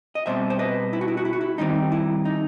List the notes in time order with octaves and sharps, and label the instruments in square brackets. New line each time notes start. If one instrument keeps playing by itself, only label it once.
[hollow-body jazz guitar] D#5
B2 G3 C4 C5 E5
C5
B4 D#5
E4
F#4
E4
F#4
E4
F#4
E4
D#3 G3 C4 D#4
E4
D#4